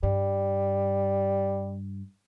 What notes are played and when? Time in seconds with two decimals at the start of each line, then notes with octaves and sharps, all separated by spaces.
0.03 G2 G3